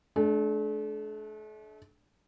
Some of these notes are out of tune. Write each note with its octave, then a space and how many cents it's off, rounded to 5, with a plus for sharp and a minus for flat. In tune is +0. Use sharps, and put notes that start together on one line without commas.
A3 -40 D4 +0